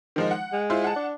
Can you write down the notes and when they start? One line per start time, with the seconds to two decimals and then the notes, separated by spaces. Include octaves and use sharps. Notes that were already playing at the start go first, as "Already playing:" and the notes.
0.16 D#3 F3 G#3
0.31 F#5
0.53 G#3
0.70 E4 F4 C5
0.84 F#5 A5
0.96 D4